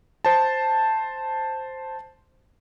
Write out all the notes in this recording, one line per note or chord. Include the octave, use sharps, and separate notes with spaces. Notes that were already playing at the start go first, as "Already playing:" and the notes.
C5 A5